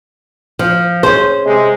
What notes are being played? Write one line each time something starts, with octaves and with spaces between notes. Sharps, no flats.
F3
C#4 G#4 C5
C3 G#3